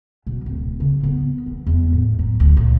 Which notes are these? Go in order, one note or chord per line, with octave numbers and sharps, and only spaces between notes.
B2
D1
C#3
B3
E3
E2
A2
F#3
D2
A#2